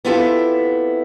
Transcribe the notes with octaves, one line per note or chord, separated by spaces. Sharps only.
B3 C4 E4 F4 G4 A4